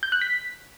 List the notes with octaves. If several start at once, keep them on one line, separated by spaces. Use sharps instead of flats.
G6
F#6
B6